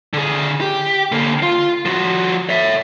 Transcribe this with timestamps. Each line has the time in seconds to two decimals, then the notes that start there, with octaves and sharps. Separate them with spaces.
0.13 D3 G#4
0.61 G4
1.12 D3 A#3
1.43 F4
1.85 F3 F#4
2.49 C#5 E5